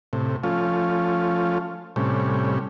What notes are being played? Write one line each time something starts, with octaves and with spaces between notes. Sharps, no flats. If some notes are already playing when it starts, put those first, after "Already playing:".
A2 C3
F3 A3 C#4 F4
A2 C3 G3 C#4